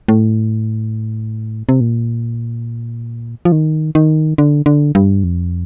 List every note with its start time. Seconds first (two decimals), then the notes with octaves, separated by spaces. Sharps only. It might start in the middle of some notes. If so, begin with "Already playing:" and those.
0.08 A2
1.69 C3
1.81 A#2
3.45 F3
3.52 D#3
3.95 D#3
4.38 D3
4.66 D3
4.95 G2
5.24 F2